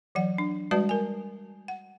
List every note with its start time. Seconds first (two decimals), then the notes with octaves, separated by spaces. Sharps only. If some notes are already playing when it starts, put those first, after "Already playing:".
0.15 E3 F#3 F#5
0.38 D4
0.71 G3 G#3 F#4 B4 D5 A5
0.89 A#4 G#5
1.68 F#5